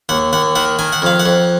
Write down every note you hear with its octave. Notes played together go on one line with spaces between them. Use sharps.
D#2 F#5
D#2 F#5
D#3 F#5
D#3 G#5
F#5
F2 F5
F#5
F2